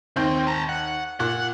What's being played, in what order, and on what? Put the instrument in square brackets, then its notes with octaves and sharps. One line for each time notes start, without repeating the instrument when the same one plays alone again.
[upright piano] D#2 G6 [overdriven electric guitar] C4
[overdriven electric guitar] A5 A#5
F#5
[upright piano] A#2 [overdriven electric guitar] F#5